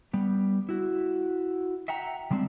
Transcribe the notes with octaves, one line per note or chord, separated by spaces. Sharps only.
G3 B3
E4 F#4
E5 F#5 G5 A#5
C#3 G3 G#3 C4 D4